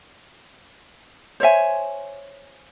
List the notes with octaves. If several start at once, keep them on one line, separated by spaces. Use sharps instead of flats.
C5 C#5 E5 G#5